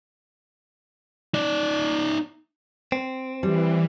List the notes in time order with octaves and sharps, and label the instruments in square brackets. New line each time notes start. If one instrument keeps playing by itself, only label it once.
[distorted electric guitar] D#4 D5
[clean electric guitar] C4
[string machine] E3 [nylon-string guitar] G3